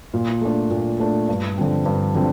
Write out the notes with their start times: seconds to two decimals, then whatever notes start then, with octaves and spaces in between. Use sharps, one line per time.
0.14 A#2
0.41 A3 D4
0.70 A#2
1.00 A3 D4
1.29 G2
1.58 D3 F3 C4
1.86 G2
2.15 D3 F3 C4